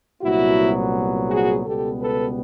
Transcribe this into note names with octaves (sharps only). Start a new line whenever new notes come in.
C2 A#2 F#3 B3 E4 F#4
F#4 G#4
C#2 B2 G3 B3 G4 A4
A4 B4